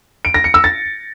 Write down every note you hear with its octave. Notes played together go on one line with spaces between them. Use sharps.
D7
A#6
C#7
E6
A6